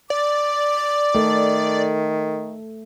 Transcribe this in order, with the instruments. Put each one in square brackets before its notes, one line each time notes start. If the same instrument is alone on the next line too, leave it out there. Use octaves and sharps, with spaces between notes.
[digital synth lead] D5 [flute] D6
[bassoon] D#3 [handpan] A3 A4